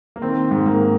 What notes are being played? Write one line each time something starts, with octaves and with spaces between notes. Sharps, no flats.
A#3
D#3 C4
G#2
A#3